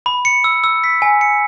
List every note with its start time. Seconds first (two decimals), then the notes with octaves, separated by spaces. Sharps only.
0.06 B5
0.25 C#7
0.44 E6
0.64 E6
0.84 B6
1.02 G#5
1.21 C#7